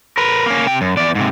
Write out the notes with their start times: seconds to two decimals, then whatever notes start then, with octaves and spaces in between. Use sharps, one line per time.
0.17 A#4 B4
0.46 A#3 C#4
0.66 C3 G5
0.81 F#2
0.97 E2 D5
1.15 G#2 C3